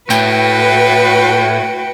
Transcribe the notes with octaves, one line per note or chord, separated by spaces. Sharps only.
A2 F#4 B4 G5